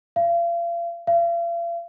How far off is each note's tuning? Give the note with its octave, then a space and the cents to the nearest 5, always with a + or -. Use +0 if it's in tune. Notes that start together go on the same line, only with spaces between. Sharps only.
F5 -40
F5 -45